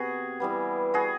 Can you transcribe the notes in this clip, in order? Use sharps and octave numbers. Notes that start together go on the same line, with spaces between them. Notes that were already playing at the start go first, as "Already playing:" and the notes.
Already playing: C3 B3 F#4 G#4
E3 G3 B3
F#4 G#4